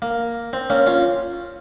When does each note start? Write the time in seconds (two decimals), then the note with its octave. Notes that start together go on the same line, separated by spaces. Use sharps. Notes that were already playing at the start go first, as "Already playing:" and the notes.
0.02 A#3
0.53 C4
0.70 A#3 C#4
0.87 C#4 F4